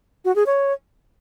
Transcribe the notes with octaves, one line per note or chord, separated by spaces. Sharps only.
F#4
G#4
C#5